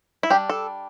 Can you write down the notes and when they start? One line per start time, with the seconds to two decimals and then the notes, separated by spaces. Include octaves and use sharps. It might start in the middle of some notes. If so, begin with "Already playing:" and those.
0.23 E4
0.30 G3 D4 G4
0.50 A4